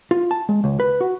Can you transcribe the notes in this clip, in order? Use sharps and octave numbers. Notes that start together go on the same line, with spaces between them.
F4
A5
G#3
C#2
B4
F#4